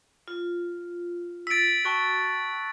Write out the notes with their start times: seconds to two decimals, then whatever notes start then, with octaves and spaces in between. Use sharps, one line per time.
0.28 F4
1.47 E6 A6 B6 D7
1.85 F#4 G5 A5 C#6 F#6